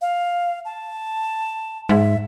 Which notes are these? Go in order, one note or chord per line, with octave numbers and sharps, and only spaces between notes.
F5
A5
G#2 E5